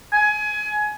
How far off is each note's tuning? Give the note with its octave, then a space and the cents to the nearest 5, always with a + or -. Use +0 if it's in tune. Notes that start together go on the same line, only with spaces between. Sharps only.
G#5 +25